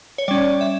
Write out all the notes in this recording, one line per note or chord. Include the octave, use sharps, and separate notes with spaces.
C#5
G3 C#4 D5
E5